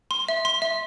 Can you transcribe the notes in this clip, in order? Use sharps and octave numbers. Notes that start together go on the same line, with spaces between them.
C6
E5
C6
E5